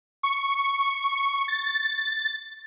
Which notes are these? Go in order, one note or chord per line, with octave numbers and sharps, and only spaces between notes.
C#6
A6